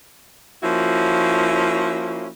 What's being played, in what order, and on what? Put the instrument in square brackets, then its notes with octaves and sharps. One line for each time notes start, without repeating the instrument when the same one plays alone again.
[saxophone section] F3 A#3 C#4 E4 F#4